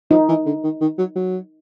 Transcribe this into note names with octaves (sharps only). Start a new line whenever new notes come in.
F3 D#4
E3
D3
D#3
D#3
F#3
F#3